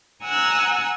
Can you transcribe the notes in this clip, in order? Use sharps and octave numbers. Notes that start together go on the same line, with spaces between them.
F#5 G#5 A#5 E6 F#6